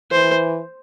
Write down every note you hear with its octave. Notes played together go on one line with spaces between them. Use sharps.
E3 C5